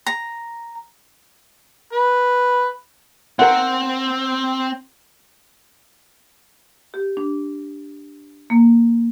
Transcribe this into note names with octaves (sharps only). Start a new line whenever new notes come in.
A#5
B4
C4 A#4 F#5
G4
D4
A#3